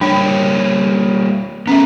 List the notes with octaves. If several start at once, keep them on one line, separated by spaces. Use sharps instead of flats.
G3 A#3 D4 C#5 G5
A3 B3 C#4 E5